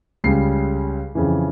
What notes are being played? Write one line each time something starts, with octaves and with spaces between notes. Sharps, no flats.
C#2 C#3 G3 C7
F2 C#3 E3